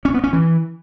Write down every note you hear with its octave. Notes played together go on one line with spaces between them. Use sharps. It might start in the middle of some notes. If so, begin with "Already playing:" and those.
C#4
B3
C#4
E3